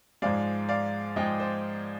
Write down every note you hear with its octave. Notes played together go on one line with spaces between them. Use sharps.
G#2 F3 G#3 D5 F5
D5 F5
G#2 F3 G#3 D#5 G5
C5